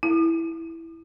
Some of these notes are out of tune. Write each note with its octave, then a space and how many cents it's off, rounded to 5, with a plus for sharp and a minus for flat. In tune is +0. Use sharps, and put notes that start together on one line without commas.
E4 +0